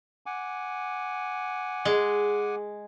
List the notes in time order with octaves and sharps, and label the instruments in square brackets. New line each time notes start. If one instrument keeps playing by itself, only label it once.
[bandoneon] F#5 G#5 D6
[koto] G#3